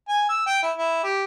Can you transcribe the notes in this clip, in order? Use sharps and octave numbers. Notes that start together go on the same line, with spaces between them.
G#5
E6
G5
E4
E4
G4